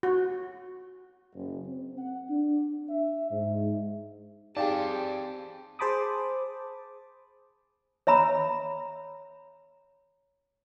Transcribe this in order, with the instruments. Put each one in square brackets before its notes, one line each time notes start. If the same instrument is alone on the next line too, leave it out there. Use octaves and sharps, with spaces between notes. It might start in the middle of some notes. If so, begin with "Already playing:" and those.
[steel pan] F#4
[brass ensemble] F#1
C4
F#5
D4
E5
G#2
[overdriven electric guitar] C4 A5 [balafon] D#4 F5 G5 [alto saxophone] G4 [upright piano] G#4 D5
[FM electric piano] G#4 C5 A5 B5 D6 D#6
[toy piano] C#5 E5 A#5 B5